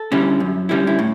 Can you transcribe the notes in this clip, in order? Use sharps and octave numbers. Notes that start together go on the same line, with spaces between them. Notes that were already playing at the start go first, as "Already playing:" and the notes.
Already playing: A4
D3 G3 C#4 E4
F#2
D3 G3 C#4 E4
E4
A2